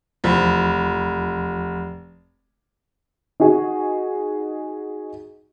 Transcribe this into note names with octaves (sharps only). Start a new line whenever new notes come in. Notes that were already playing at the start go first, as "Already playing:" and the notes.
F1 E2 F3 B5
D#4 F#4 G#4